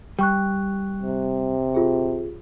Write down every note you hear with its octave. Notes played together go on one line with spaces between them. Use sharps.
G3 G5 C#6 F#6
C3
F4 G4 G#4